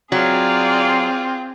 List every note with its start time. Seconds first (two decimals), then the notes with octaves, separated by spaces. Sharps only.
0.12 F#3 C4 F4 G#4 D5 F6